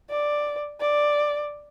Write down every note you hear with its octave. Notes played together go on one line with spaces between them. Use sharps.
D5
D5